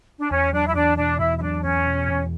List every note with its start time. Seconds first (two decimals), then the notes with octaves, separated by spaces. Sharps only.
0.19 D4
0.30 E2 C#4
0.53 F#3 D4
0.67 E4
0.75 E2 D4
0.97 B2 D4
1.19 E2 E4
1.38 E4
1.41 F#3 D4
1.63 E2 C#4
1.86 B2
2.08 E2